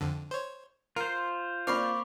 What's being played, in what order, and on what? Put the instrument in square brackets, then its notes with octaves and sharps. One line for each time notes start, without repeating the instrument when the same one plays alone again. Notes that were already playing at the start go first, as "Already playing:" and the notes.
[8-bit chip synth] F2 D3
C5 C#5
[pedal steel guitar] F4 C5 [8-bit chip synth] A#4
[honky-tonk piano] A#3 C4 D5 [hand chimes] B5 C#6 D6 [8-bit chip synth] F6 C7